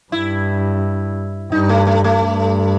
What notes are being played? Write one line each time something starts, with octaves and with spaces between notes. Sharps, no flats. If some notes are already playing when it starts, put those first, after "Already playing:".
G2 E4
G2 D#4
A3
A3
A3
G2